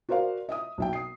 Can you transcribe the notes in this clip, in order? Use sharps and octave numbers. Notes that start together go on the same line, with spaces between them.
F#4 A#4 C5 D5 F5
D#5 E5 D#6
B1 E5 G5
D#6 C7